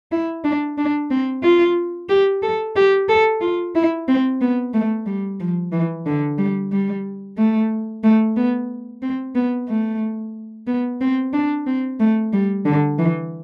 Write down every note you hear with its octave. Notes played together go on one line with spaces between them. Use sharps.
E4
D4
D4
C4
F4
G4
A4
G4
A4
F4
E4
C4
B3
A3
G3
F3
E3
D3
G3
G3
A3
A3
B3
C4
B3
A3
B3
C4
D4
C4
A3
G3
D3
E3